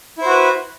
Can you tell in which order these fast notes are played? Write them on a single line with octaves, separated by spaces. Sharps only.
E4 C5 F#4 B4